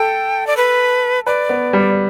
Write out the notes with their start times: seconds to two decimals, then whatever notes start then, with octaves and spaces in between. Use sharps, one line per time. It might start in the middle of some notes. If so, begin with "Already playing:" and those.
Already playing: A4 G5
0.47 D5
0.57 B4
1.27 B4 D5
1.49 B3
1.73 G3